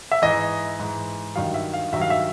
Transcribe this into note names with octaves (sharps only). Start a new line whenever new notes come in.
E5
G#2 E3 D#5
G#2 E3
G2 D#3 F#3 F5
E5
F5
G2 D#3 F#3 E5
F5
E5